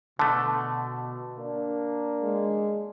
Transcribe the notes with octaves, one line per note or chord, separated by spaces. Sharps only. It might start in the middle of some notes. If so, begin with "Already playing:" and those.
B2 D3 A3 A5
A#3 D4
G#3